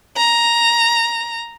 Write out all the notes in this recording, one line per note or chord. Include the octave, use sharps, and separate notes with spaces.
A#5